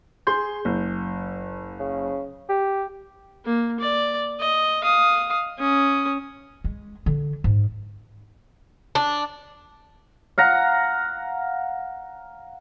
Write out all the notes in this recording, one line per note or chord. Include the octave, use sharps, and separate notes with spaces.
G#4 C6 G6
F#1
C#3
G4
A#3
D5
D#5
F5 D#6
C#4 D#6
G#3
D3
G#2
D4
F5 F#5 A#5